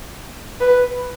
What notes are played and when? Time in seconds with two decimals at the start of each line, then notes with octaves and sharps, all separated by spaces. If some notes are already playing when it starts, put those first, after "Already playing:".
0.60 B4